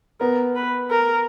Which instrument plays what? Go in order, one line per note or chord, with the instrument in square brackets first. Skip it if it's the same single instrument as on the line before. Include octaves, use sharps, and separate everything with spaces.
[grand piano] B3 [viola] A#4
[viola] B4
A#4